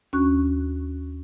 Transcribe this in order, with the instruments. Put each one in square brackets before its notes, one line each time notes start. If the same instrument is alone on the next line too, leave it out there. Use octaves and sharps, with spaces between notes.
[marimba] D#2 C#4 D4 F#4 C#6 F#6